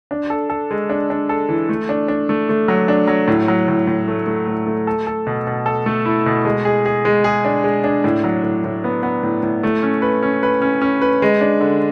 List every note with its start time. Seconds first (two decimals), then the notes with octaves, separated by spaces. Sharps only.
0.11 D4
0.30 A4
0.50 A4
0.71 G#3
0.90 D4
1.10 D4
1.29 A4
1.49 E3
1.69 A3
1.89 D4
2.08 D4
2.29 A3
2.49 A3
2.68 F#3
2.88 D4
3.07 F#3
3.28 A2
3.48 F#3
3.68 A2
3.87 A2
4.08 A3
4.27 A3
4.48 A2
4.67 A3
4.87 A4
5.07 A4
5.27 B2
5.47 B2
5.66 A4
5.86 A3
6.05 E4
6.26 B2
6.45 G#3
6.65 G#4
6.86 G#4
7.05 G#3
7.24 G#4
7.45 D4
7.64 G#3
7.84 D4
8.04 A2
8.24 F#3
8.43 A2
8.64 A2
8.84 B3
9.03 B3
9.23 A2
9.43 A2
9.63 A3
9.83 C#4
10.02 B4
10.23 C#4
10.43 B4
10.62 C#4
10.82 C#4
11.02 B4
11.22 G#3
11.41 D4
11.61 D3